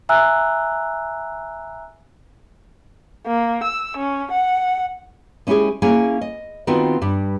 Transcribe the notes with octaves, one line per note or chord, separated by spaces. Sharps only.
E5 G#5 A#5 E6 F#6
A#3
E6
C#4
F#5
G#3 C#4 E4 F4 G4 G#4
A#3 C#4 E4 G#4 G#5
D#5
D#3 B3 C4 D#4 F4 F#4
G2 G3